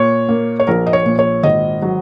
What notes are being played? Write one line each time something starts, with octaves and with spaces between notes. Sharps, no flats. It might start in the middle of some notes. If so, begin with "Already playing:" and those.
Already playing: A#2 C#5
A#3
C#5
A#1 A#4
D#5
C#5
A#2
C#5
G#1 D#5
F#3